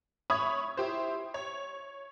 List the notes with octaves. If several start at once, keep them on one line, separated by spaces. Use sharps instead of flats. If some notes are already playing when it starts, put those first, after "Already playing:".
C#5 E5 B5 C#6 D#6 G#6
E4 G4 C5
C#5